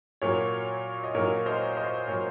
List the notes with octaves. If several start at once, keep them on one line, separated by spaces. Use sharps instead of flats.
A#2 F#3 A#4 C#5
D#5
A#2 F#3 A#4 C#5
C5 D#5
C5 D#5
A#2 F#3 A#4 C#5